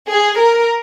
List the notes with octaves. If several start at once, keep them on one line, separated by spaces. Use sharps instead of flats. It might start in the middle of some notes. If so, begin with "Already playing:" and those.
G#4
A#4